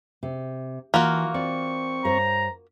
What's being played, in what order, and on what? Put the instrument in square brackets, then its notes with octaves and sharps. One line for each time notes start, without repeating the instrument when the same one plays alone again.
[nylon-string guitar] C3
[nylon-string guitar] E3 [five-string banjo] A#3 F4 F#4
[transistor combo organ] C4 C#6 [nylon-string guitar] D5
[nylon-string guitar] G2 C5 C#5 [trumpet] A#5